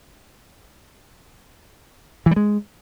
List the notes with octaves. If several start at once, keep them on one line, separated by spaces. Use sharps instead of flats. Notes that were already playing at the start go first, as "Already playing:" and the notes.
E3
G3
G#3